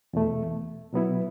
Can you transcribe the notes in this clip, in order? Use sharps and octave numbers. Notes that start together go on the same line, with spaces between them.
E2 B2 A3
B2 F#3 B3 E4